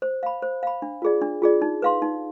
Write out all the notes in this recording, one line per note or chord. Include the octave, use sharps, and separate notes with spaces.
C5
F5 B5
C5
F5 B5
D4
F4 G#4 D5
D4
F4 G#4 D5
D#4
B4 F5 C6
D#4